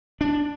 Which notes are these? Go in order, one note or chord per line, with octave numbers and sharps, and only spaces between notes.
D4